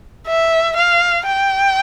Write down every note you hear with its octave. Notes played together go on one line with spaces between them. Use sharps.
E5
F5
G5